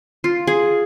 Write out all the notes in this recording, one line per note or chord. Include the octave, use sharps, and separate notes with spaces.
F4
G#4